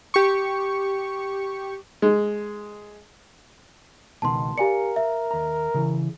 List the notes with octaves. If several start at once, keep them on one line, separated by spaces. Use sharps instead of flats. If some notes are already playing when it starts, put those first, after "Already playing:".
G4 C#6
G#3
C#2 B2 D#3 A5 C6
G4 A#4 D5 F5 G#5 A#5 C#7
E5
D#2 A#5
C#3 E3